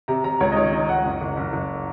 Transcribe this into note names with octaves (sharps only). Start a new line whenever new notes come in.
C3 A#5
C3 A#5
C#2 C#5
D#5
D#3 C#5
D#3 D#5
C#2 F#5
F#1
F#1
F#1
F#1